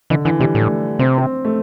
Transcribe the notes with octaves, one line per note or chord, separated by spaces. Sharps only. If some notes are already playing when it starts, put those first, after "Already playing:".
D3 E3
D3 E3
C3 G3
A2 A3
C3 C4
C4
A3